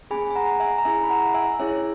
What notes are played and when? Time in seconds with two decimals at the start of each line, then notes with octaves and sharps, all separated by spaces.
0.11 A#3 C#4 G#4 G#5 B5
0.31 G#5
0.36 F#5 A#5
0.60 E5 G#5
0.78 A#5
0.85 C#4 E4 G#4 E5 G#5
1.04 B5
1.10 F#5 A#5
1.34 E5 G#5
1.59 C#4 E4 G#4 C#5 E5